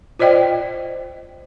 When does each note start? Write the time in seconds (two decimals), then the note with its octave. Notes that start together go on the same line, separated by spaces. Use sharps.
0.19 F4 C5 D5 D#5 G5